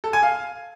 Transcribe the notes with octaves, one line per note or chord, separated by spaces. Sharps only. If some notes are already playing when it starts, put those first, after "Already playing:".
A4
G#5
F5